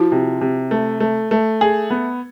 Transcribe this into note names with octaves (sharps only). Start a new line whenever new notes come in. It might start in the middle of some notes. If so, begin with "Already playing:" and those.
Already playing: F3 E4 F#4
C3
C3
A3
A3
A3
G#4
B3